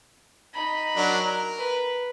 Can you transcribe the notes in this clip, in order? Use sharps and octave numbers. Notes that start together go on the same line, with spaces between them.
D#4 B5
F#3 D4 A#4
A#4
B4